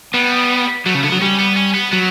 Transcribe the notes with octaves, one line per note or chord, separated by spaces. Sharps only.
G3 B3
F#3 A3
C#3
D3 B3
F#3
G3 C#4
B3
C#4
B3
F#3 B3